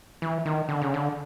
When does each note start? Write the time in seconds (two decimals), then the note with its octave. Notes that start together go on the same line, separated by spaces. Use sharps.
0.22 E3
0.45 D#3
0.68 D3
0.82 C#3
0.94 D3